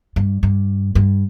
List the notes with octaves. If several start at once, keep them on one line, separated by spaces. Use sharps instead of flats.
G2
G2
G2